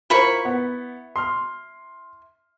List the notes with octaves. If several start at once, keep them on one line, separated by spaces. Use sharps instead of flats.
E4 F4 A#4 C5 B5 C#6
B3
C6 F6